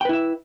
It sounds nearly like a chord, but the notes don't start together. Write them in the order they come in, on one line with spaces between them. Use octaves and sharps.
G5 B4 E4 E5